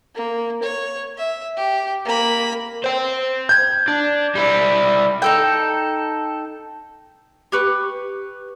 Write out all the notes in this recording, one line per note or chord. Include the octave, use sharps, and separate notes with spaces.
A#3
C#5
E5
G4
A#3 B5
C5 G5
G6 G#6
D4
G3 E4
D#4 A4 G5
G4 B4 C#6